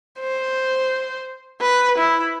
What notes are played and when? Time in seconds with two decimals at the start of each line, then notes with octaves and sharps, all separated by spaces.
0.19 C5
1.61 B4
1.98 E4